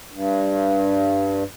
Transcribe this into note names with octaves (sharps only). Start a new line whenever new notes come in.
G2